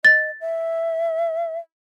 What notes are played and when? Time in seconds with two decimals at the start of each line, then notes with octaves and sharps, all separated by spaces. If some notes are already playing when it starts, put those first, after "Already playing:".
0.05 D#5 A6
0.41 E5